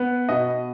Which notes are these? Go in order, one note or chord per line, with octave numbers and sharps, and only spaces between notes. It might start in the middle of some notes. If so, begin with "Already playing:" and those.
Already playing: B3
B2 D#5